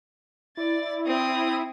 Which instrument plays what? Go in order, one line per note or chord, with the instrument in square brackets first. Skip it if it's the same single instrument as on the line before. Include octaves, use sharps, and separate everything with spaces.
[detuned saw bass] E4 [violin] D5 A6
[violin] C4 D#6